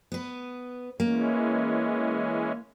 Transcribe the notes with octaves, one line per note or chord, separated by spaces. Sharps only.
B3 B4
E3 G#3 A#3 C#4